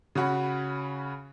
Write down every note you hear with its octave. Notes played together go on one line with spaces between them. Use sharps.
C#3 C#4 F#4 B5